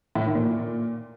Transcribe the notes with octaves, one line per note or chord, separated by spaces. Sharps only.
A2
D#3
A#2